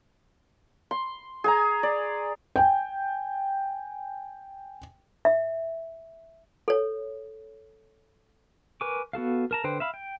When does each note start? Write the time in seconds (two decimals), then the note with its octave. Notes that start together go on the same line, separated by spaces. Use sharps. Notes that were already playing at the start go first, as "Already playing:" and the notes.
0.91 C6
1.44 G#4 G#5 A#5
1.83 D5
2.56 G5 G#5
5.25 E5
6.68 A4 C#5
8.81 A#4 B4 G#5 C#6 D6
9.13 B3 F#4 A4 F5
9.51 A#4 A5 A#5
9.64 D3 B4 C5 G5
9.80 E5 F5 B5
9.94 G5